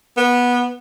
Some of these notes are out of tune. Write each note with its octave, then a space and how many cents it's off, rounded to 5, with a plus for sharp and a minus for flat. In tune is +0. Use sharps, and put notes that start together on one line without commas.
B3 -15